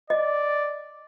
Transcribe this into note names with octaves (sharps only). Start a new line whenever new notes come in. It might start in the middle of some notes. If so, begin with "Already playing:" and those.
D5 D#5